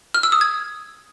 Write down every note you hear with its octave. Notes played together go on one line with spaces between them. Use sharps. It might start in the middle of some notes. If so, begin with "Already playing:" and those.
F6
E6
D#6
G#6